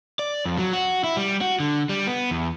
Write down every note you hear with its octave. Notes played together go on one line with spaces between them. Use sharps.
D5
F2
F#3
F#4
E4
G3
F#4
D3
G3
B3
E2